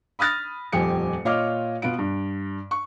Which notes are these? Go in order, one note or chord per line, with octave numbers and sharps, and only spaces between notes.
B5 D#6 F6 A6 A#6
D#1 F2 G4 G#5 C#7
A#2 F4 C#5 D#5 D6 F6
B2 B3 F4 D7
G2
C#6